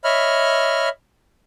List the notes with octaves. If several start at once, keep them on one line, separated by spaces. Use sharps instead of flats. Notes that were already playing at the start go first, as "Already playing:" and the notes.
C#5 D#5 E5 B5 F6